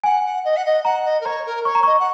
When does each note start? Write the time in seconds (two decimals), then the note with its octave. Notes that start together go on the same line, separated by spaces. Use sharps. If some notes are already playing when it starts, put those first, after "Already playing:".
0.04 F#5 G#5
0.25 F#5
0.44 D#5
0.56 F#5
0.65 D#5
0.84 F#5 A#5
1.05 D#5
1.20 A#4
1.25 C#5 A#5
1.45 A#4
1.65 C#5 C#6
1.75 A#5
1.83 D#5 C#6
1.99 F#5